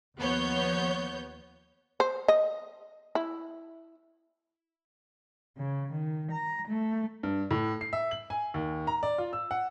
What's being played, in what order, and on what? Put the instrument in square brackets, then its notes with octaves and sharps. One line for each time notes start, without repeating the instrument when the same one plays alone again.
[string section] D#2 F3 B3 C#5 G6
[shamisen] C5
D#5
E4
[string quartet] C#3
D#3
A#5
A3
[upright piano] G2
A2
C7
E5
F#7
G#5
D#2
A#5
D5
F4
E6
F#5